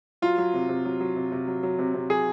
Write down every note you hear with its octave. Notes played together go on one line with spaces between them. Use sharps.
F#3 F4
F#3
C3
C3
F#3
F#3
C3
C3
F#3
F#3
C3
C3
F#3 G#4